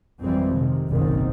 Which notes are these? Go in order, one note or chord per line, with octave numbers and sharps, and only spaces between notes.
G#1 F2 E3 G3 G#3 C4
C3 D#3
F#1 B1 G#2 D#3 C4